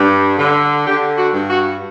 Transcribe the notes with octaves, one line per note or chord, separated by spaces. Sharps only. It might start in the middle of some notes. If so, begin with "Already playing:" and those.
Already playing: G2
D3
D3 G4
F#4
G2
F#4